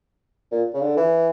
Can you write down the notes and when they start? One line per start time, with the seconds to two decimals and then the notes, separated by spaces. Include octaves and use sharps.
0.52 A#2
0.74 C#3
0.81 D3
0.97 E3